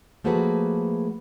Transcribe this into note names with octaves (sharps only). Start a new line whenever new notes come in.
F3 A3 A#3 F#4 G#4 B4